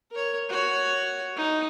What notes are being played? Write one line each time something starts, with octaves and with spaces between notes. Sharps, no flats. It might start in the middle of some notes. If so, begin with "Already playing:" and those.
A#4 C#5
F#4 C#5
D#4